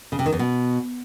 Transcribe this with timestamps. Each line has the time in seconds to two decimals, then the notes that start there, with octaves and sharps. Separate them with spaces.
0.12 C#3
0.19 C3
0.26 D#3
0.33 E2
0.39 B2